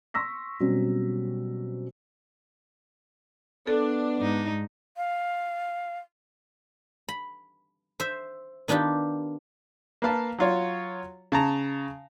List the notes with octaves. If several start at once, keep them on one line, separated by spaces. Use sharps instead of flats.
C6 C#6 E6 A#6 B6
B2 F#3 G3 C4 C#4
B3 D4 A4
G#2 D#4
F5
B5
C5 E5
D#3 B3 D4 F4 G4
A#3 B4 F5 A5
F#3 F4 C#5
C#3 A5 A#5